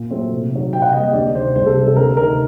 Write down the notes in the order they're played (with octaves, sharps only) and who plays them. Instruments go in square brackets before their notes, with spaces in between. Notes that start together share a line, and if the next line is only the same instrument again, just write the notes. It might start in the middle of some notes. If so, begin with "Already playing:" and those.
Already playing: [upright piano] A#2
F#3 A3 C4
C3
D#3 F#3
C3 G5
F#5
G3 A#3 D#5
D#5
D2 D5
C3 D#3 C5
C2 C5
A4
C3 G3
A4
D2 A#4
C3 D#3 A#4